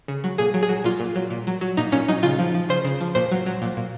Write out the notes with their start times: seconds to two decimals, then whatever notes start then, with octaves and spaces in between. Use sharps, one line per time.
0.08 C#3
0.24 F#3
0.38 A#2 G#4
0.54 F#3
0.63 G#4
0.69 F#3
0.84 A#2 F4
1.00 A#2
1.16 F#3
1.31 A#2
1.47 F#3
1.61 F#3
1.77 A#2 D#4
1.92 A#2 C#4
2.08 F#3 D#4
2.23 C#3 F4
2.39 F3
2.54 F3
2.69 C#3 C5
2.85 C#3
3.01 F3
3.15 A#2 C5
3.31 F#3
3.46 F#3
3.62 A#2
3.77 A#2